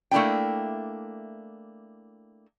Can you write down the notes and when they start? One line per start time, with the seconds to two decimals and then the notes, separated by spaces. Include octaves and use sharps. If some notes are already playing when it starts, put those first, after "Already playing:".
0.11 A3 A#3 D4 E4 G5